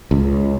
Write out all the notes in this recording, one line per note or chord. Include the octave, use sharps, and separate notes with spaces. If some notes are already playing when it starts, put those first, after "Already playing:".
C#2